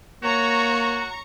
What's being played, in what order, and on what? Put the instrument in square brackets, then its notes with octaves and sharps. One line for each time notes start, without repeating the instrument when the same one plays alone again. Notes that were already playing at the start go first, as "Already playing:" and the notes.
[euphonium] A#3 [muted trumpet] F#4 [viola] C#5 [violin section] A#5 C#6